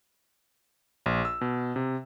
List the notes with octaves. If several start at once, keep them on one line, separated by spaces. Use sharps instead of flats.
A#1
E6
B2
C3